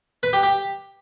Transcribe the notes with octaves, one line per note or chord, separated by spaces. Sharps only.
B4
G4
G4